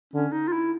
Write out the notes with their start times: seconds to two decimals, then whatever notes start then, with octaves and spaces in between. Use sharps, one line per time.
0.13 D3 C#4
0.32 D#4
0.48 F4
0.52 E4